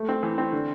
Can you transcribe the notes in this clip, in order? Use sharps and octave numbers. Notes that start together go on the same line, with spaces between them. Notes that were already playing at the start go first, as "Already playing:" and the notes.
Already playing: A3
C4
E3
C4
D3